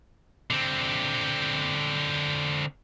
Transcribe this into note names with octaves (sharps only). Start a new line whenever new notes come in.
D3 C4